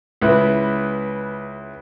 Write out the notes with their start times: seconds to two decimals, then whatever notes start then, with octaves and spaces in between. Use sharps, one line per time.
0.22 C#2 E4 B4